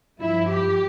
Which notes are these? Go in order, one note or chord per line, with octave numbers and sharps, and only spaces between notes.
G2 F3 E4
G4